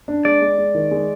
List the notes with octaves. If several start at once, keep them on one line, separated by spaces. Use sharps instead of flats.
D4
G#3 D5
G#3
G#3
D#3
G#3